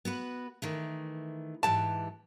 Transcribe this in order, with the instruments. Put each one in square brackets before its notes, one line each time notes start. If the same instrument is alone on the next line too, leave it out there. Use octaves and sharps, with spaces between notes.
[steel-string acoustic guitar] B3 F#4 B4
D#3 E3 A3
[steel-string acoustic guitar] G#2 E3 G4 [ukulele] A5